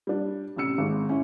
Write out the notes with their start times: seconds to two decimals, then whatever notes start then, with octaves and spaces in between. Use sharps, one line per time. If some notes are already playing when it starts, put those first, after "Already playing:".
0.07 G3 D4
0.56 A1 C3 E6 C#7
0.78 G#1 G#2
1.09 C#4 E4